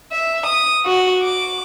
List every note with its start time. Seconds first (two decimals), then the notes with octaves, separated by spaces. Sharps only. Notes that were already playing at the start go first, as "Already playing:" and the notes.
0.12 E5
0.46 D#6
0.84 F#4
1.23 D6